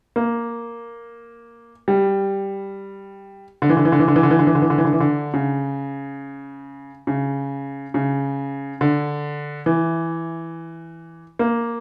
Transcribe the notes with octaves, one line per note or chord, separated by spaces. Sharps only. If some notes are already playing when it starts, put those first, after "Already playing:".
A#3
G3
D3
E3
D3
E3
D3
E3
D3
E3
D3
E3
D3
E3
D3
E3
D3
E3
D3
E3
D3
C#3
C#3
C#3
D3
E3
A#3